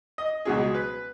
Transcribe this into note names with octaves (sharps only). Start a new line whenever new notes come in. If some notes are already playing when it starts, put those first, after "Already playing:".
D#5
C#2 B2 F#3 G#4
B4